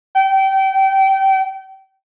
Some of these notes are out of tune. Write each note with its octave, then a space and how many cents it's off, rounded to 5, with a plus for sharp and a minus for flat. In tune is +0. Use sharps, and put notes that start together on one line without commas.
G5 -25